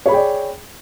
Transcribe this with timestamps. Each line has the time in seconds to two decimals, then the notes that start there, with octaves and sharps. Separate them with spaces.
0.06 C#5
0.08 B5
0.11 G#4
0.13 G5
0.16 D5